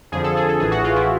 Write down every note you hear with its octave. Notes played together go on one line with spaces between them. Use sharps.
F2 D3 F3 G#4
A4
G#4
A4
A1 A2 E3 G#4
F#4
F4
E4